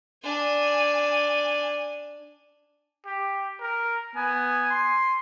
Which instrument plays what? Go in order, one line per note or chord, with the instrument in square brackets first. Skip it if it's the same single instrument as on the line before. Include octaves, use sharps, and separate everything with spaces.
[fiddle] D4 G#5
[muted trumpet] G4
A#4
[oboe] B3 [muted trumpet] G#5
[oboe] C6